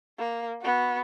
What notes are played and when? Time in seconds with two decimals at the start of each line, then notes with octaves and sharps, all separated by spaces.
0.18 A#3
0.61 B3 F#4